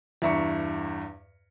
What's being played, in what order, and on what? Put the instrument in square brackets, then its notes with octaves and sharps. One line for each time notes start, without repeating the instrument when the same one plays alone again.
[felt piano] E2 G2 E5 A#5 C#6 C#7